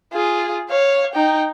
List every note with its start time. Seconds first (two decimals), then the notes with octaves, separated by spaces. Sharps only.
0.13 F4 G#4
0.70 C#5 F5
1.13 D#4 G5